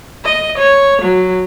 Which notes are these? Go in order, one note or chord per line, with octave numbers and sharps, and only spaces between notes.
D#5
C#5
F#3